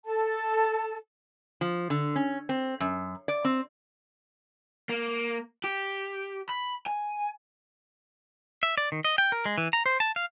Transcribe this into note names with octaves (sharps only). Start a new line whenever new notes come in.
A4 A5
F3
D3
C#4
C4
F#2
D5
C4
A#3
G4
B5
G#5
E5
D5
D#3
D#5
G5
A#4
G#3
E3
A#5
C5
A5
F5